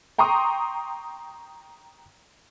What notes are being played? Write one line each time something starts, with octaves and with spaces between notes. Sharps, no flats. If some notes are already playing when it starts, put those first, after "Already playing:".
G5 A#5 C6 C#6 D#6